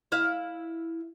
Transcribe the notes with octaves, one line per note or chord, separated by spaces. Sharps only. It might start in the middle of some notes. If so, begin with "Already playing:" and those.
E4 F5